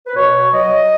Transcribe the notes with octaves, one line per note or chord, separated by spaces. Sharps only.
B4
B2 C#5
F#3 D#5